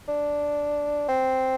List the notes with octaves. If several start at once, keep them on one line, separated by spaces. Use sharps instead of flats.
D4
C4